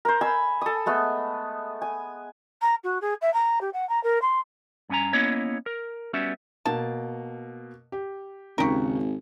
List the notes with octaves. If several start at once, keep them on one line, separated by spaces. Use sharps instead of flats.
A#4 C5
G#5 B5 E6
A4 D#6
G#3 A3 B3
G#5
A#5
F#4
G#4
E5
A#5
G4
F#5
A#5
A#4
C6
G2 C#4 G#5 A#5
A#3 B3 C#4 E4 C#5 D#5
A#4
G3 B3 C#4 F#4 E5
B2 A#3 A5
G4
G#1 D#2 C#3 G4 A#4 C#6